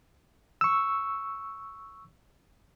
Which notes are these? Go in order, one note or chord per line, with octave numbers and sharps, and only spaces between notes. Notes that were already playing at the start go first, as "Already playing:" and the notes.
C#6 E6